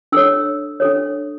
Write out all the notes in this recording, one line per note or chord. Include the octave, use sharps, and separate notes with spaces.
D4 A4 C#5 E6
D4 A4 C#5